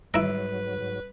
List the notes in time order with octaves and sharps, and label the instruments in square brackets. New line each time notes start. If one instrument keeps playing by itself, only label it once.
[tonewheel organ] G#2 F#3 [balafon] G3 [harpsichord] E4 A#5 [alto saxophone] B4